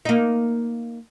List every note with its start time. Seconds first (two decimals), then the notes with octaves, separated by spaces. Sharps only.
0.05 A#3 D#4